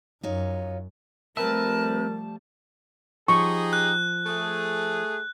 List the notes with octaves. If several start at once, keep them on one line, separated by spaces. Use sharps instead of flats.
F#2 D#4 F4 C#5
F3 G3 A3 C4 A#4 B4 E5 A5
F3 D#4 G4 G#4 C#6
F#6
A3 G#4